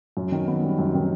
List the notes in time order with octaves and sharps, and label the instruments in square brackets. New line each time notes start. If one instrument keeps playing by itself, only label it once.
[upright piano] F#2
D#3
B3
G3
F#2
D#3